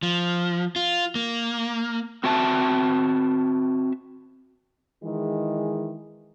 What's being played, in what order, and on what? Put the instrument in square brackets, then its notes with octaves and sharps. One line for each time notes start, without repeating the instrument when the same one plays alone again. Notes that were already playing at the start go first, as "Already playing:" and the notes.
[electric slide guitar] F3
F4
A#3
C4 F#4 E5 A5
[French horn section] D#3 E3 G#3